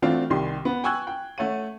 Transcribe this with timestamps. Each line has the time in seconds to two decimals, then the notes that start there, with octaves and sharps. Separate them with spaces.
0.02 E3 A3 C4 D4 F4 F#4
0.30 C2 D#3 G4 C6
0.65 B3
0.84 G5 G#5 C#6 E6 F#6 G#6
1.07 G5
1.38 A3 C#5 F#5 D#7